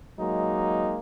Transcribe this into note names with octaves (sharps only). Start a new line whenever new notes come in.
F#3 G#3 A#3 D#4